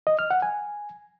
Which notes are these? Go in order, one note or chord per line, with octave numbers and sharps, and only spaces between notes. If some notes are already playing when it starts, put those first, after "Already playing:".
D#5
F6
F#5
G#5